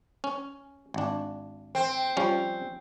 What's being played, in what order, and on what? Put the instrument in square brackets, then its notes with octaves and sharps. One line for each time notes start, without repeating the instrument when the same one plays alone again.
[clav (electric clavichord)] C#4
G#1 D4
[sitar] C4
[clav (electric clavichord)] F3 G3 C#4